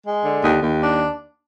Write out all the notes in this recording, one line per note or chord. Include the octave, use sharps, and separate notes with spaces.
G#3
D3
D#2
D#2
D4